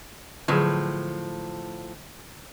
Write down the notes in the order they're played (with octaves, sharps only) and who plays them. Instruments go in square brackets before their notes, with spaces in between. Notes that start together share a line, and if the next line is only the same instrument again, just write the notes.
[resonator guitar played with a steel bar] A2 F3 [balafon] D3 F#3 G#4